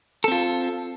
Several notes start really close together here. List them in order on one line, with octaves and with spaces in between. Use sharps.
A4 C4 F4